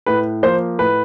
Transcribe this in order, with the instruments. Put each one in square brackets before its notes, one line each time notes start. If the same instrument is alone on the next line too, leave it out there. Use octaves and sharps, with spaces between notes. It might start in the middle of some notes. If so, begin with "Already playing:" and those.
[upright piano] A2 B4
F3 A#3 C5
A2 B4